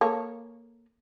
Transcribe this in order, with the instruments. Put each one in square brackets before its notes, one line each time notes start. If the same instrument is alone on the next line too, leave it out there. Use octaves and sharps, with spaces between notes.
[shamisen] A#3 A4 C#5